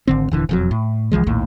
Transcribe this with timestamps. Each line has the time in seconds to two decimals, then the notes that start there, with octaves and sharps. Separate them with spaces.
0.07 G#1 D3 C4
0.31 D#1 D3 E3
0.49 E1 F2 F#3
0.71 A2
1.12 C2 E3 F3 G#3
1.26 A#1 D#2 A2